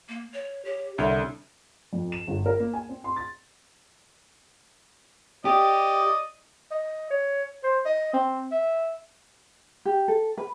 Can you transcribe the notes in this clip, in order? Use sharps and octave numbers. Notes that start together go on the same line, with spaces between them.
A#3
C#5
G4 C#5
C2 D3 C#5 E5
F2
E7
G1
A#4
A#3
G#5
C4
C6
A6
G4 D5 D#5 D#6
D#5
C#5
C5
D#5
C4
E5
G4
A4
B4